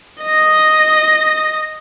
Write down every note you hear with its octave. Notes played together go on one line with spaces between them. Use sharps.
D#5 A#6